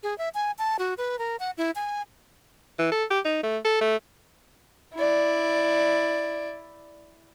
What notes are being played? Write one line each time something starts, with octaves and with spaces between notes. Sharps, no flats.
G#4
E5
G#5
A5
F#4
B4
A#4
F#5
E4
G#5
E3
A4
G4
D#4
A3
A4
A3
E4 D5